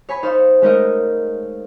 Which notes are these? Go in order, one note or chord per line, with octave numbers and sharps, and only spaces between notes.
C#5 G#5 B5
D#4 A4 C5 C#5 F5 C6
G#3 A3 C#4 D#4 A#4 D#5